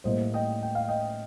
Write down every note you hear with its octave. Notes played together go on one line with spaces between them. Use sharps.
A2 G3 A#3 C5 D#5
D#5 G5
G5
F5
D#5 G5